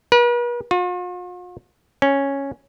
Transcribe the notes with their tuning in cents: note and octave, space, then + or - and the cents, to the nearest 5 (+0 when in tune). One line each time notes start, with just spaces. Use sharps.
B4 -45
F4 +45
C#4 -5